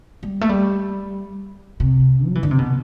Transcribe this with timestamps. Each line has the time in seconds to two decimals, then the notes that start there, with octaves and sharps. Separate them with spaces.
0.23 G3
0.41 A3
0.49 G3
1.80 C3
2.28 F#3
2.35 E3
2.43 D3
2.51 C3
2.59 B2